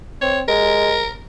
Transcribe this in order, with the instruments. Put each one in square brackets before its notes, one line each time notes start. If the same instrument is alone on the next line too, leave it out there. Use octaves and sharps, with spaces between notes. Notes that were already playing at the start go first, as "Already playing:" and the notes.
[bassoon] C4 [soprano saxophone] C#5
[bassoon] G#3 [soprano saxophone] A#4